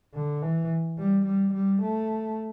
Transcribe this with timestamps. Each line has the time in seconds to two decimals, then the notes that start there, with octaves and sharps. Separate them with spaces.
0.14 D3
0.42 E3
0.98 G3
1.26 G3
1.54 G3
1.83 A3